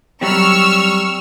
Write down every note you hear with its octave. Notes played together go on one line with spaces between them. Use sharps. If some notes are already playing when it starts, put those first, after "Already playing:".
F#3 G3 C4 C#6 E6 F6